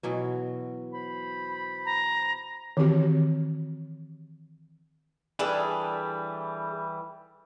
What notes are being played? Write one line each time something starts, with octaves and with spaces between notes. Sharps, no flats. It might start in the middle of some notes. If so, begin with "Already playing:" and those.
B2 E3 F#3
C5 B5
A#5
D#3 E3 C4 F#4 G4 C#5
E3 G3 D4 G#4 A4